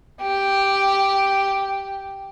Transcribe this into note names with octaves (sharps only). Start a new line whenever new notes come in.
G4